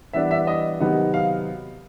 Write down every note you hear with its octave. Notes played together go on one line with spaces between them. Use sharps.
E3 G3 B3 D4 E5
E5
D#5
C3 D#3 F#3 B3 D#4
F5